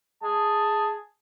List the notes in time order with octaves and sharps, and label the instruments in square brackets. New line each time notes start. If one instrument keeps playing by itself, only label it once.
[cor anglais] G#4 [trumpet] A5